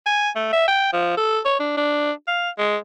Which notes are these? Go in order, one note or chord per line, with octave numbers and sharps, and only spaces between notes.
G#5
A3
E5
G5
F3
A4
C#5
D4
D4
F5
G#3